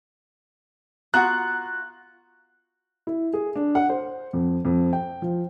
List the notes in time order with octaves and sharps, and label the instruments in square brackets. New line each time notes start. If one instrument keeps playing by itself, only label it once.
[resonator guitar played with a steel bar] B3 A#5 [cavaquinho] F4 F#4 [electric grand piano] F#6
[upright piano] E4
G#4
D4
F#5
C5
F2
F2
G5
F3